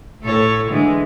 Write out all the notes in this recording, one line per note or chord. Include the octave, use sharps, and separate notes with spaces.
A2 A4 C#5
D3 E3 G#3